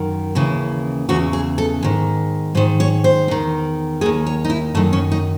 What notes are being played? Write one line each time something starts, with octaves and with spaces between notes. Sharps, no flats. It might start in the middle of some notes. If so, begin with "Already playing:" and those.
Already playing: F#2 D#3
D#2 C#3 E3
E2 C#3 E3 F#4
G#4
A4
G#2 D#3
G#2 D#3 C5
C#5
C5
E2 D#3
D#2 D#3 G#4
C#5
D#4
E4
F#2 D#3 A3
C#4
D#4